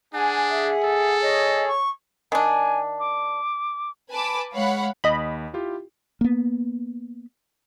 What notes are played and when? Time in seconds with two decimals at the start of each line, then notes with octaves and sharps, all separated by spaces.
0.14 D4 G#4 F#5 G#5
0.50 E5
0.84 A4
1.22 C#5 D#5
1.67 C#6
2.32 D#3 D4 G#5
2.99 D6
4.10 B4 G#5 A5 B5 D6
4.53 G#3 C#5 F5 F#5 B5
5.04 D#2 D#5 B5
5.53 E4 F4 G4
6.21 A#3 B3